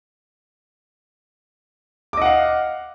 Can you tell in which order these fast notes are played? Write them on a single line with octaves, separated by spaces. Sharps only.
D6 D#5 F#5 F5